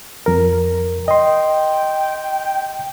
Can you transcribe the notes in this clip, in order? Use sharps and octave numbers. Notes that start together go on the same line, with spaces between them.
F2 A#4
D#5 G5 C6